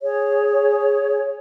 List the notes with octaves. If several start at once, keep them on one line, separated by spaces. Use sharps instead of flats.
G#4 C#5